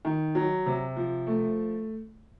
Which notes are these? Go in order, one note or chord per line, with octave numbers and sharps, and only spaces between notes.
D#3
F#3
C3
F3
A3